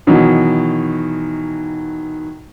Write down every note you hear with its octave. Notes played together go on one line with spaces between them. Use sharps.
B2 D#3 E3 F#3